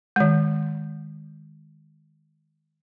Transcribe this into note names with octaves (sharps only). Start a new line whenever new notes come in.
D#3 G#3